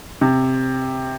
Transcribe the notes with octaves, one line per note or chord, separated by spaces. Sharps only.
C3